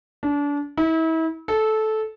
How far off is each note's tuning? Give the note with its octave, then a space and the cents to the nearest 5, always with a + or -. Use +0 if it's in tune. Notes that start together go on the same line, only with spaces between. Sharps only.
D4 -30
E4 -35
A4 -15